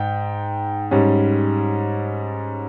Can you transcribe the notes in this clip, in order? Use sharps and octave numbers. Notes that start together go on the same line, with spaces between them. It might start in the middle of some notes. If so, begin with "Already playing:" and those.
Already playing: G#2 G5
G#2 G3 C#4